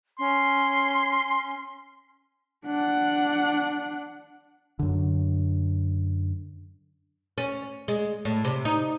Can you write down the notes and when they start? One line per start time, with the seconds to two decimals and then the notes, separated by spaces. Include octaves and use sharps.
0.19 C#4 C6
2.65 D4 F#5
4.79 F#2 D3
7.38 C#4
7.88 G#3
8.25 A2
8.45 C3
8.65 D#4